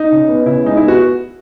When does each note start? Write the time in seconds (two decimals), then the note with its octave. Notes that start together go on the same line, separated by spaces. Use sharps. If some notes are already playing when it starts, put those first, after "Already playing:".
Already playing: D#4
0.12 C#3
0.28 B3
0.46 C#3 E4
0.64 G#3 D#4
0.77 B3 E4
0.88 F#4